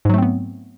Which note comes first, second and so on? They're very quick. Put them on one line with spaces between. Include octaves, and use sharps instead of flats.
G#2 F#3 A3 C4 B3